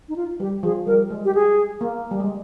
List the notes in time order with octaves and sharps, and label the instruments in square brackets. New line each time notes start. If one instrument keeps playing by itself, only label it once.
[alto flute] D#4
F4
[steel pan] G3 [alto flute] G4
[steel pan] F3 [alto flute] G#4
[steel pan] G3 [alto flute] A#4
[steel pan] G#3
[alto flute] G4
G#4
[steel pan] A#3
G3
G#3